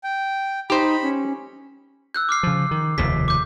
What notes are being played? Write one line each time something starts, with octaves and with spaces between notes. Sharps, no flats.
G5
D#4 G4 C5 B5
C#4
E6 F#6 G6
D6 F6 C7
C#3 F3
D#3
F1 D#2 C#3 B6
D6 G6